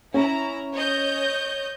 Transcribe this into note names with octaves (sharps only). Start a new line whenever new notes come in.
C#4 E4 A#5
C#5 D#5 G6